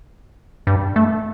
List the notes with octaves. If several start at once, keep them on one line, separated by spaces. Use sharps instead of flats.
G2
A3